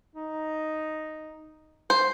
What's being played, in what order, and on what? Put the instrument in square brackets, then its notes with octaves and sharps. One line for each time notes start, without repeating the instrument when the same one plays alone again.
[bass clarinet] D#4
[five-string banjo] C5